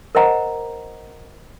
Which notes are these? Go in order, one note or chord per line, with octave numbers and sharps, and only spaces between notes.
A#4 C5 D#5 F#5 A#5